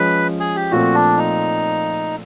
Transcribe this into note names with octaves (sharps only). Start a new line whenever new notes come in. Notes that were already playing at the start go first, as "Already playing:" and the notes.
Already playing: F3 G#3 C#4 B4
G#4
G4
A#2 F3 A3 C4 F#4
D4
D#4